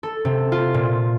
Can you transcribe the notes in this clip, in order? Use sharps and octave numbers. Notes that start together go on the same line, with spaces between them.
A4
C3
F4
A#2